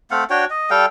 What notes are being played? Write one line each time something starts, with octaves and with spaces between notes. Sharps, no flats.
A3 C4 F5 F#5
D4 F#4 C#5 G5
D#5
G3 A4 F5 G5